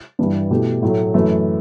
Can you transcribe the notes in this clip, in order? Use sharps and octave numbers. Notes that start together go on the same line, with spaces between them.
G2 E3 G3
B2 A3 E4 G4
A2 F#3 A3
F#2 E3 A3